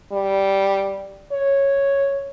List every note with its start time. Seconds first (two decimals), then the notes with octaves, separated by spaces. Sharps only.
0.12 G3
1.32 C#5